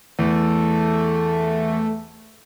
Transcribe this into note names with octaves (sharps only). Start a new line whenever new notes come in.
E2 A3